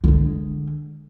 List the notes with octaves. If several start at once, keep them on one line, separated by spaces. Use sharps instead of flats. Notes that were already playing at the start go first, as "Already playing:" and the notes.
D3 G#3